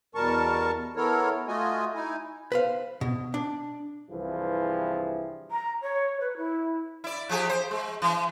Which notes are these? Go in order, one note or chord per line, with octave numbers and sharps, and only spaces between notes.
E2 B2 G3 A#4 A5 C#6
E3 B3 E4 A4 A#4 C#5
A3 F4 F#4 D#5 G#5
D#4 E4 G#5
B4 C5 F5
B2
D4
C2 G2 E3 F3 E4 G#4
A#5
C#5
B4
E4
E4 D5
F3 G4 G#4
C5
G#3
E3